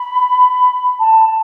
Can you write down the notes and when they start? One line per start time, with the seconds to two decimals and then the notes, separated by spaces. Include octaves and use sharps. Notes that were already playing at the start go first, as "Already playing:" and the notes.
Already playing: B5
0.99 A5